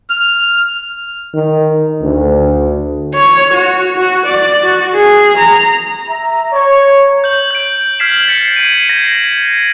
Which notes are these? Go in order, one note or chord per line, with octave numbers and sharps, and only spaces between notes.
F6
D#3
D2
C#5
F#4
F#4
D5
F#4
G#4
A#5
E5 A#5
C#5
G6 F#7
G6 D7
F6 G#6 B6 C7 E7 F#7
A6 C#7
G#6 C7 D7 D#7
G#6 A#6